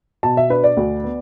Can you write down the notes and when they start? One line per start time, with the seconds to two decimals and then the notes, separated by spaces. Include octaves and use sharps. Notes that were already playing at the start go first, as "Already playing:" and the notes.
0.23 B2 A5
0.37 E5
0.50 D4 B4
0.64 D5
0.77 D2
1.04 B3